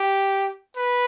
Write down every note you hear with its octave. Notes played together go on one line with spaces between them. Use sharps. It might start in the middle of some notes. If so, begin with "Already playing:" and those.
Already playing: G4
B4